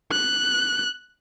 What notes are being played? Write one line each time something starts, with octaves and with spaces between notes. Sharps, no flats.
F#6